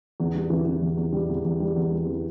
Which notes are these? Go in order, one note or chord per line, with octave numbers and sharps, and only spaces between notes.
E2
G3
E3
E3
E2
E2
G3
E2
E2
G3
E2
G3
E3